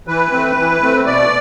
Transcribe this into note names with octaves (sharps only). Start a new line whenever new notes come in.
E3 B4
A3 C4
E3
A3 C4
B2 D5